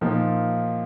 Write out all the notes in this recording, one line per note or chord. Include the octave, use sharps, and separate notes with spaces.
A#2 F3 A#3 D#4